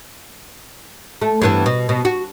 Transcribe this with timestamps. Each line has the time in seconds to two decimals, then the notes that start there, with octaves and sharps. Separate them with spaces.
1.21 A3
1.42 G2 E3 B3
1.66 B2
1.89 B2
2.05 F#4